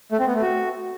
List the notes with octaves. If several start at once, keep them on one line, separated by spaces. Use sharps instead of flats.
A3
C4
B3
A3
F#4